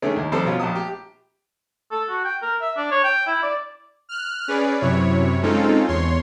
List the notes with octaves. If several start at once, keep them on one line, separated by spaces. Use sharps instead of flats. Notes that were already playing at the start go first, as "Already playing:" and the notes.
D3 D#3 G#3 A3 C#4
D#2
F2 G3 A4 C5 A5
B2 C#4 F4
A#1 G4 A5 D#6
G4
A4
F#4
G5
A#4
E5
D4
C#5
G5
E4
D5
F6 F#6
C#4 G#4 B4 D5
F#2 C3 E4 C#5
G#3 C4 C#4 D#4 F4 A4
E2 C#5 C6